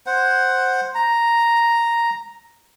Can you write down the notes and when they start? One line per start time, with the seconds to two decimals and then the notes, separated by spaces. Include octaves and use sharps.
0.06 C5 F#5
0.95 A#5